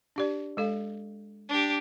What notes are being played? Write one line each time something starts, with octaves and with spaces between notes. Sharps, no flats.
D4 G4 D5
G#3 A4 F5
D4 G4